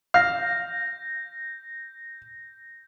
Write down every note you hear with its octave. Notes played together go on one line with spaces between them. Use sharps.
F5 G6 A#6